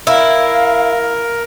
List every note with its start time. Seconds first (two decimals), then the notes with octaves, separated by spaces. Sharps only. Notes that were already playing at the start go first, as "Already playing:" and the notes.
0.07 E4 A#4 F5